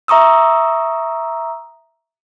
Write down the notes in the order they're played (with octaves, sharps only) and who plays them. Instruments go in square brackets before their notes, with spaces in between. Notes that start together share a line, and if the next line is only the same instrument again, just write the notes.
[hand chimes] E5 A#5 C#6 D#6 E6